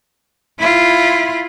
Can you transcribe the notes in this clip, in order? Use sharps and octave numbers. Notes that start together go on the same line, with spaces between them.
E4 F4